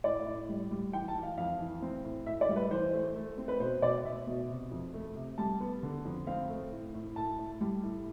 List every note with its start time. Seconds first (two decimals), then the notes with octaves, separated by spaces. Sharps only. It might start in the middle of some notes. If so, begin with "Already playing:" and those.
0.04 A2 D5
0.26 A2
0.49 G3
0.71 G3
0.93 E3 G5
1.08 A5
1.16 E3
1.23 F5
1.37 F2 F5
1.60 E3
1.82 C4
2.04 A2
2.26 A2 E5
2.41 D5
2.49 G3
2.56 B4
2.71 E3 C5
2.93 A3
3.16 A3
3.38 C4
3.48 B4
3.60 B2 C5
3.82 B2 D5
4.04 B2 E5
4.27 B2
4.49 C3
4.71 F2
4.94 A3
5.16 C3
5.38 G3 A5
5.60 B3
5.83 D3
6.05 F2
6.27 C4 F5
6.49 A3
6.71 A2
6.94 A2
7.16 A2 A5
7.39 A2
7.61 G3
7.83 A2